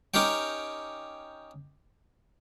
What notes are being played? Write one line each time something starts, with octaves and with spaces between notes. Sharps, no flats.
C#4 D#4 G4 A#4 C#5 G5